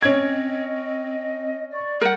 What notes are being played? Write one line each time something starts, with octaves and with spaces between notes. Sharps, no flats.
C4 C#4 D#5 G#6
D5 C#6
G3 A#4 F#5 G6